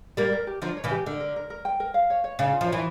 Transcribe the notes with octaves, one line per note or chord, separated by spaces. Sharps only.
G3 A#3 G4
A#4
G4
D3 F3 A#4
C#5
C#3 E3
G4
D3 A#4
A#4
A#4
A#4
G5
A#4
F5
C#5
C#5
C#3 F5
F4
F3
E3 C#5